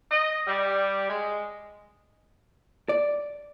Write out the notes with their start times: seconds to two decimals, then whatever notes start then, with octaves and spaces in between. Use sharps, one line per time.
0.11 D#5
0.47 G3
1.10 G#3
2.89 D5